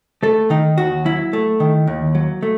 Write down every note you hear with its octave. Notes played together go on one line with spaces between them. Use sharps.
A3 A4
D#3 D#4
D#2 F#4
F#3 E4
A3
D#3
D#2
F#3
A3